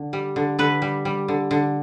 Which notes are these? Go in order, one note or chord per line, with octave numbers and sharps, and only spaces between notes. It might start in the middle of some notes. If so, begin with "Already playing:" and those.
Already playing: D3
G3
D3
D3 B4
G3
G3
D3
D3